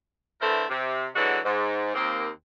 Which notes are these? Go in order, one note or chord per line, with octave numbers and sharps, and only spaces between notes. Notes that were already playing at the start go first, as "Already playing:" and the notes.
D3 E3 A3 E4 A#4 C5
C3
D3 E3 F#3 G#3 F#4 A4
G#2
D#2 A#3 C4